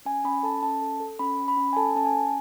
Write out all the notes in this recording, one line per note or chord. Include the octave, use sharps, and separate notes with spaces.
C#4 G#5
C#4 B5
A4 A5
C#4 A5
A4
A4
C#4 B5
C#4
B5
C#4
G#5
A4 A5
C#4 A5
G#5
C#4